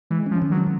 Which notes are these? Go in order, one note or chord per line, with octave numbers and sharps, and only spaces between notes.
E3 G#3
F3 C#4
D#3
F#3